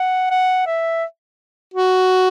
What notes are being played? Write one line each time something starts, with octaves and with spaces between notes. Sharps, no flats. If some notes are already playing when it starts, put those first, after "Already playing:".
Already playing: F#5
F#5
E5
F#4